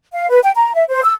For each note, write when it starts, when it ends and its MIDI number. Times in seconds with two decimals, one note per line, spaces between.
0.13 0.28 77
0.29 0.39 71
0.42 0.51 79
0.55 0.73 82
0.74 0.83 76
0.89 1.01 72
1.03 1.13 88